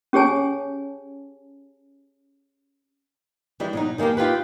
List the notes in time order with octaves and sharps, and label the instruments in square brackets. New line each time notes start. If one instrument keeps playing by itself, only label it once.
[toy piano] C#4 G4 G#4 C#5 G#5 A5
[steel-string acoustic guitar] E3 G3 G#3
B2 F#3 D#4
D#3 G#3 A#3 B3 G4
D#4 F4 G4 B4